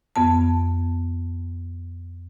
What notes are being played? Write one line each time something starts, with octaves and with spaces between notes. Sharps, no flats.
F2 B3 A5